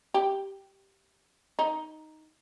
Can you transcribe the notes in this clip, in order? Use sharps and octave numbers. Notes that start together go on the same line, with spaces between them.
G4
D#4